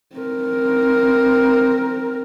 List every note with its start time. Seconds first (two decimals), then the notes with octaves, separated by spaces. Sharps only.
0.15 C4 A#4